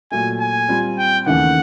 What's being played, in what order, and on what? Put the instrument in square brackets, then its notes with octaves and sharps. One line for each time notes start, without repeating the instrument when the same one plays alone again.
[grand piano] A#2 F#3 A3 [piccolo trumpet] G#5
[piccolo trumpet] G#5
[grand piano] G3 C4 F4
[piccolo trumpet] G5
[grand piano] D#2 C#3 E3 A3 [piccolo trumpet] F#5